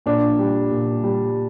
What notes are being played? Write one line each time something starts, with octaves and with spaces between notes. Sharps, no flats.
A#2 D4
G3
A#2
G3